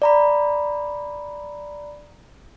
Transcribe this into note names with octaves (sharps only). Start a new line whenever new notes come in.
D5 A#5 B5